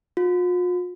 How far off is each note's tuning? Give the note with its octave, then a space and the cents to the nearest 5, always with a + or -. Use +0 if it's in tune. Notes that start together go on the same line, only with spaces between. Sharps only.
F4 +45